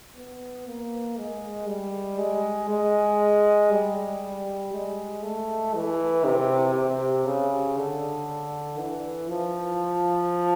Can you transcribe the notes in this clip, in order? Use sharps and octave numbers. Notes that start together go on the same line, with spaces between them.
B3
A#3
G#3
G3
G#3
G#3
G3
G#3
A3
E3
C3
C3
C#3
D3
E3
F3